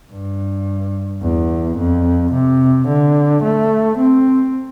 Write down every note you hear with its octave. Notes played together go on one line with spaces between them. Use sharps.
G2
E2
F2
C3
D3
A3
C4